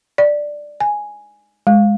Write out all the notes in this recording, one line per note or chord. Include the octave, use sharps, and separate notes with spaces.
D5
G#5
G#3